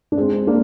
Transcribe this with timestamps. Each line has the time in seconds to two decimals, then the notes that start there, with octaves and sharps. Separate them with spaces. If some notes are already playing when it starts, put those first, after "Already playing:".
0.12 D4
0.17 G#3 C4
0.47 A#3 D4